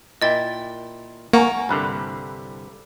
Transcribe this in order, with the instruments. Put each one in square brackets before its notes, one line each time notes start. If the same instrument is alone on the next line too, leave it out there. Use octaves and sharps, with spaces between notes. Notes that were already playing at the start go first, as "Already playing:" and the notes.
[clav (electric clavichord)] A#2 E4 G5 [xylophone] D#5 A6
[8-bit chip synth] A#3 [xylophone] F#5 [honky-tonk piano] G#5 A#5 C#6
[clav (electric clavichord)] C2 G2 D3 [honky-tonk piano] B5 F#6